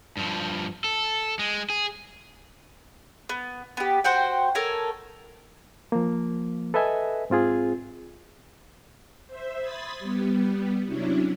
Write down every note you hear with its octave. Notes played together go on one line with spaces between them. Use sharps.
G2 F3
A4
G#3
G#4
B3
B3 G4
F#4 C5 F#5 G5
A4 A#4 C#5 G#5
F3 A#3
A4 B4 D#5 E5 G#5
G#2 C4 F4 G#4
C5 E5
B5 C6 D#6 G#6 A6 B6
G3 B3
C3 F#3 C#4 D4 E4